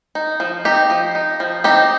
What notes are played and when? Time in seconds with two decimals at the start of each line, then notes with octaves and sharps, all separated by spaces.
0.15 D#4
0.40 F3
0.65 C4 D#4 G4
0.90 F3
1.15 D#4
1.40 F3
1.64 C4 D#4 G4